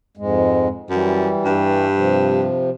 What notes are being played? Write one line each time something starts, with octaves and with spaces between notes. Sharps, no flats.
F2 G#2 G#3
F#2 E3 G3
G2
C3 F3